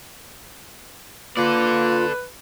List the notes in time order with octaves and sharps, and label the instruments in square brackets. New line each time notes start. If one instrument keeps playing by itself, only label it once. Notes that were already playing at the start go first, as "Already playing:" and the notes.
[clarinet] A#3 [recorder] F4 [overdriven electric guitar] A4 D5 [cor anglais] B4